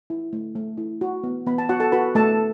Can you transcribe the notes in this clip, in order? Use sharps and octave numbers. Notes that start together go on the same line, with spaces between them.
E4
A3
A3
E4
F#4
B3
B3 B5
A5
F#4 F#5
A4 A5
F#4 B4 B5
A3 A4 A5